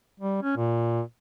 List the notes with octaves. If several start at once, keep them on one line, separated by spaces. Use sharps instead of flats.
G3
C#4
A#2